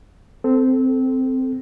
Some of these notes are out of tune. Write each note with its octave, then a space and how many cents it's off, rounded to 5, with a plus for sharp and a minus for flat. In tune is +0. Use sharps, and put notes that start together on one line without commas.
C4 -10 A4 +0